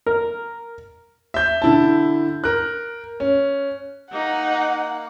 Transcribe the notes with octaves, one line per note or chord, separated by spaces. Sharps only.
A#4
E5 G6
D3 E4 A5
A#4 F#6
C#4
A#3 D#4 F#5